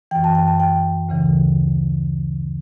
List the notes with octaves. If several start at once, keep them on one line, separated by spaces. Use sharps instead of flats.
F#2 E3 G5
A5
G5
A5
G5
D2 C#3 E3